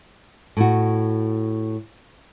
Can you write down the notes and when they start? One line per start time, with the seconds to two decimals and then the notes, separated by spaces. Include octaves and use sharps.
0.57 A2 F#4